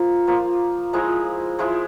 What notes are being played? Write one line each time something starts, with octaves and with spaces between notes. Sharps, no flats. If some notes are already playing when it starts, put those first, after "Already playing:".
Already playing: F3 A#3 F4 A#5
F3 A#3 F4
F3 G#3 E4 A#5
F3 G#3 E4